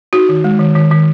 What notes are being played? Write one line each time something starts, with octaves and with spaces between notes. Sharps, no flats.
D#4 F#4
D#3
G#3
D#3
D#3
D#3